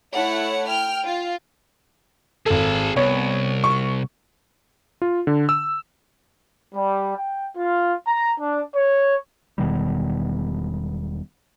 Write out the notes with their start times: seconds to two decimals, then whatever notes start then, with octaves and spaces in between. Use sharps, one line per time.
0.14 A3 E4 C#5 F#5
0.67 G5 F6
1.05 F4
2.46 G#1 G#4 A4 A5
2.96 C2 B3 C#5
3.64 C#6
5.02 F4
5.27 D3
5.49 E6
6.75 G3
7.17 G5
7.57 F4
8.07 A#5
8.40 D4
8.76 C#5
9.58 E1 B2 D#3 G3